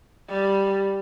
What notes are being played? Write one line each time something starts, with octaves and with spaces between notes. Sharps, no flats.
G3